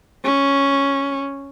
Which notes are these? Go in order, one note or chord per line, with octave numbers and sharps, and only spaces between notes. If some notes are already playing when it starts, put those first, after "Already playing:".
C#4